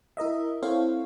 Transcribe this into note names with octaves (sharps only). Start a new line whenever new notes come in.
E4 A#4 D#5 E5
C4 E4 A4 C5 C#5 F5